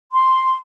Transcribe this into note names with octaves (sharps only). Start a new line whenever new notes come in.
C6